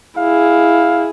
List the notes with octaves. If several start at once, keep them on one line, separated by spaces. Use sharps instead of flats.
E4 G#4 F5